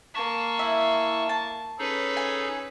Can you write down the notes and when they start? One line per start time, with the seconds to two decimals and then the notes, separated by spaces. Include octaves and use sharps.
0.15 A#3 A5 C#6
0.59 E4
1.29 A5
1.79 C#4 D#4 G#4 A4 B4
2.17 G#5